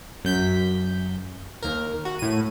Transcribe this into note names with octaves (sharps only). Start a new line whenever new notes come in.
F#2 G6 B6
D#2 A#4
F#4
A2 D#7